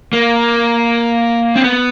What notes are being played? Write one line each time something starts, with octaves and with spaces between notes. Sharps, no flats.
A#3
C4
B3